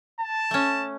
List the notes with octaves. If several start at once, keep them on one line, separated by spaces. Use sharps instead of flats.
A5
A3 C#4